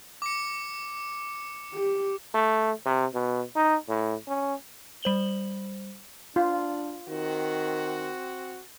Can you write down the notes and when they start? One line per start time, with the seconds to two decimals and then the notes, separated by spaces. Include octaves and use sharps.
0.22 D6 C#7
1.73 G4
2.34 A3
2.86 C3
3.14 B2
3.56 D#4
3.89 A2
4.28 C#4
5.03 G3 C5 F#7 G7
6.36 D4 F4
7.08 D#3 C4 F#4